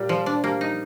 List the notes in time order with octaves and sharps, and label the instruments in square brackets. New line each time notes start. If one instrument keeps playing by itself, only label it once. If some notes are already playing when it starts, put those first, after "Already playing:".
Already playing: [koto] A#2 [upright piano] G3
[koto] F3
D4
[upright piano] G3 [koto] A#3
[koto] D#4